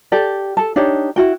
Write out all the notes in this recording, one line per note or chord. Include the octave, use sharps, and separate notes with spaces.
G4 A4 D5
A4 A5
D4 D#4 G4 C#5
E4 F#4 G5